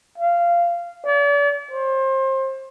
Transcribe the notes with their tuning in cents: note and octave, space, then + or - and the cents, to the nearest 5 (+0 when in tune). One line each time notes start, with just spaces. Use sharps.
F5 -15
D5 -40
C5 +30